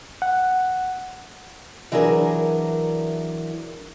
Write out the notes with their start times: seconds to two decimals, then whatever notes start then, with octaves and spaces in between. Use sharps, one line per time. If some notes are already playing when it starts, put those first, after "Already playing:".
0.22 F#5
1.92 E3 F#3 D4 G#4 A#4